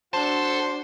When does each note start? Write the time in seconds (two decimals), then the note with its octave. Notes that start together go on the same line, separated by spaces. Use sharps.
0.14 D4 F#4 A4 C5 A5